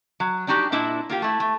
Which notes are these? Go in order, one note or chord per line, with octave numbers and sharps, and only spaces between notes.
F#3
G3 D4 D#4 F#4 G4
A#2 D4 E4 D#5 E5
A#3 F4 G4
A3 E4
A3